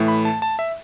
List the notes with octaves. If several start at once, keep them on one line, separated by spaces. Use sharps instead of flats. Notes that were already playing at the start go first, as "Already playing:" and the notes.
Already playing: A2 E3 A3
B5
A5
A5
E5